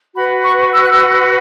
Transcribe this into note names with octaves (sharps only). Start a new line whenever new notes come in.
F#4 B4 B5
C#6
E6
F#6
E6